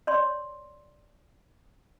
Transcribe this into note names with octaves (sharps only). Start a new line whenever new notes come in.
C#5 D5 C6